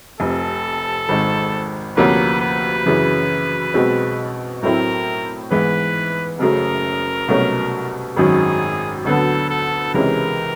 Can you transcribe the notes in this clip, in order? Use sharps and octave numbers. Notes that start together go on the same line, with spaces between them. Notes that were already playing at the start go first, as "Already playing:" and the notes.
F1 F2 C3 A4
G#1 G#2 D#3
D2 C3 F3 A#3 C#4 B4
B4
F#2 C#3 E3
B1 B2 G#3 C4
A2 F#3 A3 C4 E4 A#4
G#2 E3 G#3 B3 E4 B4
F#1 F#2 C#3 F#3 A3 A#4
C2 B2 F#3 A3 C#4
G#1 F#2 D#3 F#3 G#4
D2 D3 F#3 B3 A4
A4
C#2 C3 E3 G#3 C#4 A#4